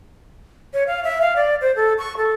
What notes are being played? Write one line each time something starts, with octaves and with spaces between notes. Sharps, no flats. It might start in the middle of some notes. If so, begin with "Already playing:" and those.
C#5
F5
E5
F5
D5
C5
A4
C#6
A4